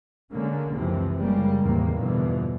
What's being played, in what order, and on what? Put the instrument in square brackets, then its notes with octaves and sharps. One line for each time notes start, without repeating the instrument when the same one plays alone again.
[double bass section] D3 G#3 A#3 C#4
C#2 F#2 C3 E3 F3
F#1 C#3 G3 G#3 A#3
E2 A2 C3 D#3 A#3
E2 G2 B2 D3 E3 F3